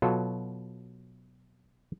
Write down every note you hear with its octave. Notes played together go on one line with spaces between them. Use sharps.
B2 F#3 F4 A4